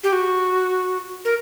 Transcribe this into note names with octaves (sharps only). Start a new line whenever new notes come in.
G4
F#4
A#4